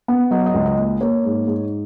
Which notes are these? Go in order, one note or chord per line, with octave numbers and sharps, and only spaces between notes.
B3
F#3 D#5
D#5
C#2
D#5
A#3
A#3 C#5
G#2
G#2